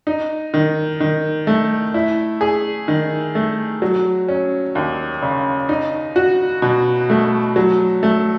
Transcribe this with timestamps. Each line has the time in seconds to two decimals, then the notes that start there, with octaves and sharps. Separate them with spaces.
0.07 D#4
0.54 D#3
1.00 D#3
1.47 A3
1.94 E4
2.41 G#4
2.88 D#3
3.35 A3
3.82 F#3
4.28 C#4
4.75 D#2
5.22 C#3
5.69 D#4
6.16 F#4
6.62 B2
7.10 A3
7.56 F#3
8.03 A3